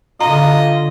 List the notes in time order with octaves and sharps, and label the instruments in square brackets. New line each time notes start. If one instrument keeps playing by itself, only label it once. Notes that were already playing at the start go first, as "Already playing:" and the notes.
[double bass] D3 [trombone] F4 [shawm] D#5 [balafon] A#5